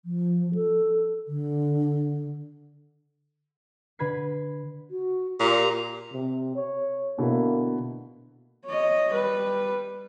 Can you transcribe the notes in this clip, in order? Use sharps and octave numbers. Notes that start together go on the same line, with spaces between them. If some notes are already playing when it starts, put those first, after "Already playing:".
F3
A4
D3
D3 B4 B5 G#6 C7
F#4
A#2 G4 A#5
C3
C#5
B2 D3 A#3 E4
C#5 D#5
G3 B4